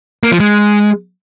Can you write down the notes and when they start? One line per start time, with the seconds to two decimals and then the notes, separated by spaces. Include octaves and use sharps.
0.23 A#3
0.32 F3
0.40 G#3